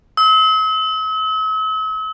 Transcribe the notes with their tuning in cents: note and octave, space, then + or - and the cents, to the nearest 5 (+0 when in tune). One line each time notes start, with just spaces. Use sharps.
E6 -45